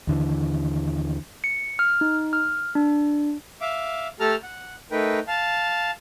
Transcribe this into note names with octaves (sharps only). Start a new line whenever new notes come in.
D#2 D3 E3
C#7
F6
D#4
F6
D4
E5 F5 D6
A3 G4 A4 A5 A#5 F6
F#5
A3 D#4 A#4 B4 G5
F5 A5